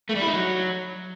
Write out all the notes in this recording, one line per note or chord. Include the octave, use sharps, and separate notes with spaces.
A3
G3
E4
D#4
F#3